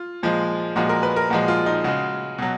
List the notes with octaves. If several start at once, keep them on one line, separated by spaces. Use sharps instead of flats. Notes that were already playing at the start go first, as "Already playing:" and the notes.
Already playing: F4
A#2 F3 G#3
A#2 F3 G#3 F#4
A#4
B4
A#4
A#2 F3 G#3 F#4
F4
D#4
C#3 G#3 F#4
B2 F#3